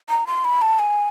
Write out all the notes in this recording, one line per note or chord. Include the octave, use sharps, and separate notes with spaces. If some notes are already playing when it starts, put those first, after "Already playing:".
A#5
C6
B5
A5
G#5